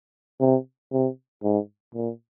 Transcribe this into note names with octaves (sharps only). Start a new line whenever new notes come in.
C3
C3
G#2
A#2